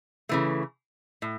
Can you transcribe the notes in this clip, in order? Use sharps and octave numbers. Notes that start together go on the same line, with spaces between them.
C#3 E3 A3
A2